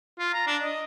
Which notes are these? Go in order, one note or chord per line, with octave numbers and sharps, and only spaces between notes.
F4
A#5
D4
D#5